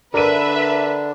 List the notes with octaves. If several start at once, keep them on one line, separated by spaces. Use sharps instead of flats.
D3 D4 A#4 B4 E5 D#7